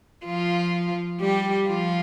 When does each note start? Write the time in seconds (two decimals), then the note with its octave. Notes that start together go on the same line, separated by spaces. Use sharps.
0.25 F3 F4
1.20 G3 G4
1.68 F3 F4